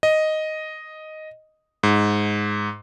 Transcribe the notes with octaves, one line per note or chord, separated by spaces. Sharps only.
D#5
G#2